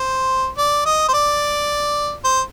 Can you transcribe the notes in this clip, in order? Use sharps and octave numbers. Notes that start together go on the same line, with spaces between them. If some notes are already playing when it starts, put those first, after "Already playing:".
Already playing: C5
D5
D#5
C5
D5
C5